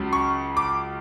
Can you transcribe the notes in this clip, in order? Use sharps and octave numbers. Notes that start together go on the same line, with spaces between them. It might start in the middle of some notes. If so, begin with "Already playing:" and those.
Already playing: C#2 C#3 F#3
C#6
D6